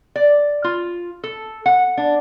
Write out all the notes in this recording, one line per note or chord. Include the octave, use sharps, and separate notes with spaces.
D5
F4
A4
F#5
D4